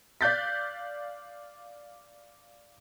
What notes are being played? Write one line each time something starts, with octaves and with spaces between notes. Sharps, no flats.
D5 F5 F#6 G6 A6 B6